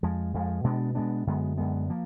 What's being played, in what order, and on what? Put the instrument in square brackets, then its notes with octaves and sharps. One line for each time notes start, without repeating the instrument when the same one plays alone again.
[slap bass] F2 F3 G#3
F2 F3 G#3
B2 G#3 B3 D4
B2 G#3 B3 D4
F#2 D3 G#3 B3
F#2 D3 G#3 B3
F3 A#3